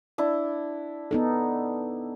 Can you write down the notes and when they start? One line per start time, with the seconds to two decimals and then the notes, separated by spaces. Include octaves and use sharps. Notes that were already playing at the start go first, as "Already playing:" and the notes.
0.18 D4 E4
1.11 B3 D#4 A4